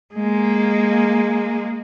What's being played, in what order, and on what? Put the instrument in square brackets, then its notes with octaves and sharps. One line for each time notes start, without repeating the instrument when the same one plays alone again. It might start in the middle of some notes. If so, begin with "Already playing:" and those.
[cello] G#3 A#3